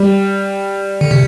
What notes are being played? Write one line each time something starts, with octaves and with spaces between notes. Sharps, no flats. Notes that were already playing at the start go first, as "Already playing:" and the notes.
Already playing: G3
D3
C3